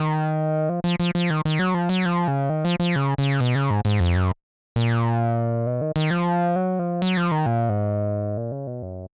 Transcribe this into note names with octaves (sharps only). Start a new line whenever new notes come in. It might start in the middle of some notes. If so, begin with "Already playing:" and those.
Already playing: D#3
F3
F3
F3
F3
D#3
D#3
F#3
F3
F#3
F3
C#3
D#3
F3
F3
C#3
C#3
B2
C#3
G#2
G#2
F2
F#2
A#2
B2
D#3
D#3
F3
F#3
F3
F#3
F3
D#3
A#2
G#2
A#2
C#3
B2
F#2